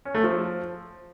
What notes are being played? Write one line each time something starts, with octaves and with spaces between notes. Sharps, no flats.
C#4
A3
F3